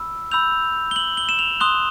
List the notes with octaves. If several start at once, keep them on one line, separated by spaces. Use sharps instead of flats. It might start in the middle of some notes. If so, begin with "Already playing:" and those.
Already playing: B5 E6
B5 E6 G6 F7
G7
F#7
G7
E7
F7
C6 D#6 F#6 G7